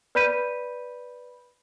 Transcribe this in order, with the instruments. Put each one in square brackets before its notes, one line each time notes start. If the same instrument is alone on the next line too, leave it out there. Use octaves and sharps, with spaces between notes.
[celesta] B4 D5 B5 G6 B6 D#7